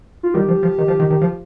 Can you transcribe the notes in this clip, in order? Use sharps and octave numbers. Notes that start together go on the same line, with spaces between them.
F4
D#3 G3 G4
F3
F3
D#3
F3
D#3
D#3
F3